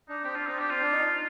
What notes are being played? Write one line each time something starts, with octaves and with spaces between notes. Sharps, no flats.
D4 D#4
C4 G4
D4 F4
C4 D#4
D4 G4
C4 F4
D4
D#4